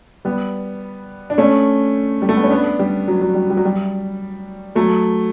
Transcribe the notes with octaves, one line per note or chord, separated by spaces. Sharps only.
G3 B3
D4
A3 C#4
G3
A3
B3
C#4
B3 D4
G3
F#3
F#3
G3
G3
F#3
G3
F#3 A3